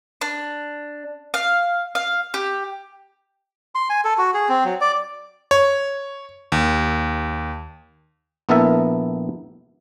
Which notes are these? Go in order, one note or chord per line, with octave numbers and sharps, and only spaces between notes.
D4
F5
F5
G4
C6
G#5
A4
F#4
G#4
C4
F#3
D5
C#5
D#2
A#1 B3 E4 A4 A#4 E5